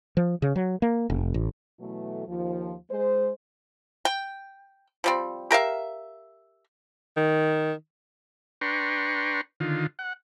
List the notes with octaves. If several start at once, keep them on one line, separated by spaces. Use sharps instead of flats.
F3
C#3
F#3
A#3
F1
A1
B2 E3 F#3 A3
D#2 F3
G#3 C5
G5
F3 G3 C4
G4 A#4 E5 F5
D#3
D4 B4 G5 A#5 C6 C#6
D3 D#3 F4
F#5